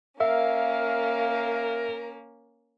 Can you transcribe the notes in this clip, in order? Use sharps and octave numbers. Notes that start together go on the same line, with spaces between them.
A#3 C#4 A#4 E5 F5